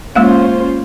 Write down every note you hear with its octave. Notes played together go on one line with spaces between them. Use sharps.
G#3 A#3 C#4 F4 C5 F5